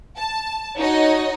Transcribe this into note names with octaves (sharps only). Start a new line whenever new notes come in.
A5
D#4 F#4 C#5 D#5